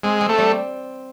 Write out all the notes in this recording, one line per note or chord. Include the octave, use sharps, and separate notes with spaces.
G#3 C4
C4
A3
G3